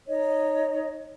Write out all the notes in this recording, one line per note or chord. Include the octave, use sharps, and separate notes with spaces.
D#4 C#5 D#5